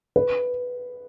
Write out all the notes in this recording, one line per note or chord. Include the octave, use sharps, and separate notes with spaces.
B4